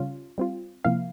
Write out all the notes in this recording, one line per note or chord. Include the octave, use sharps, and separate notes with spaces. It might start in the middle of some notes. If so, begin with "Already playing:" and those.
Already playing: C#3 G3 C#4 F4
G3 C4 F4
C3 F3 A#3 E4 F5